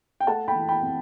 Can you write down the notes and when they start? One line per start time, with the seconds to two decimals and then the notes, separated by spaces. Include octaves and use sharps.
0.20 G5
0.27 A3 F#5 A5
0.48 G5 B5
0.55 E3
0.69 G5 B5
0.82 C4